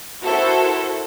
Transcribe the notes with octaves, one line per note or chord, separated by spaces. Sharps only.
E4 F#4 A4 A#4 C5